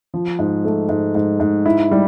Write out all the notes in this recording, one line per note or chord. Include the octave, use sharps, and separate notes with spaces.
F3
G#2
A3
G#2
G#2
G#2
E4
G3